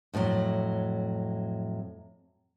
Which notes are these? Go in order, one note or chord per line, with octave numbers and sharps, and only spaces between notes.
F2 A2 D3 F#3 A3